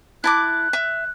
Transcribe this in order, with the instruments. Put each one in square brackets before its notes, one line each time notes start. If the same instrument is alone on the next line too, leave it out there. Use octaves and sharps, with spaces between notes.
[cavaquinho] E4 A5 D6 [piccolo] F#6
[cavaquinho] E5